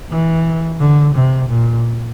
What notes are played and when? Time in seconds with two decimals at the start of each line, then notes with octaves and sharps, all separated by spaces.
0.10 E3
0.80 D3
1.15 C3
1.50 A#2